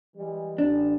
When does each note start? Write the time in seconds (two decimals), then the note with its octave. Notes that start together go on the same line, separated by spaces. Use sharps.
0.16 E3 G3 G#3
0.58 A1 D4